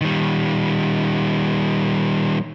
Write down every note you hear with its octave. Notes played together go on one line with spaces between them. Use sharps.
D#3 G3